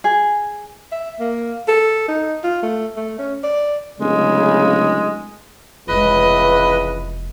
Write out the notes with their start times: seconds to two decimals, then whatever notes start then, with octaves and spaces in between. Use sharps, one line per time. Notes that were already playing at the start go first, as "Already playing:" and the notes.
0.04 G#4
0.92 E5
1.20 A#3
1.68 A4
2.08 D#4
2.44 F4
2.63 A3
2.96 A3
3.19 C#4
3.44 D5
4.00 D1 C#3 G#3
5.89 F1 C#2 E3 G#3 B4 D#5